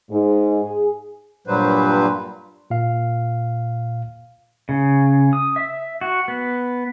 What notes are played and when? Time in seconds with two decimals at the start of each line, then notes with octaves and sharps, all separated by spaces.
0.11 G#2
0.63 G#4
1.47 G2 A#2 F#3 G3 B4 C5
2.70 A#2 F5
4.69 C#3
5.33 D#6
5.56 E5
6.01 F#4
6.28 B3